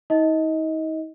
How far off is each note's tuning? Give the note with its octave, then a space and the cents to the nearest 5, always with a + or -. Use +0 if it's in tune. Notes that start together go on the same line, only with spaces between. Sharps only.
D#4 +40 D#5 +25